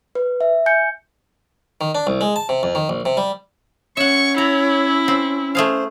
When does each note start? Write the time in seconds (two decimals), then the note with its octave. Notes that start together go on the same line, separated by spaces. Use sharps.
0.15 B4
0.41 E5
0.66 G#5 G6 C#7
1.81 D#3
1.95 D4
2.07 C2
2.21 G#3
2.36 A5
2.49 C3
2.63 F2
2.75 D#3
2.89 A#1
3.06 C3
3.17 G3
3.97 C#4 C#5 E5 F#5 C#6
4.38 E4 A#5
5.08 C4
5.55 A3 G#4 C5 F5